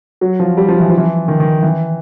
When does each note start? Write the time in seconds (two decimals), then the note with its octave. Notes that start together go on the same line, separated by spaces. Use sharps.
0.21 F#3
0.40 F3
0.57 G3
0.68 F3
0.80 E3
0.90 F3
0.98 E3
1.28 D#3
1.40 D#3
1.63 E3